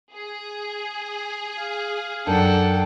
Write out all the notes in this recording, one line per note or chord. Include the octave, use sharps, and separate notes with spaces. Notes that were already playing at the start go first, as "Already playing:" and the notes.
G#4
F5
F#2 D4 A4 F#5 G5 A5